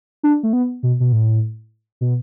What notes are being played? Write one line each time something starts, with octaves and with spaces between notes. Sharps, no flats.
D4
A3
B3
B2
B2
A2
B2